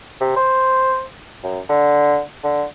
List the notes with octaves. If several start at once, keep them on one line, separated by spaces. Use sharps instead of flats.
C3
C5
F#2
D3
D3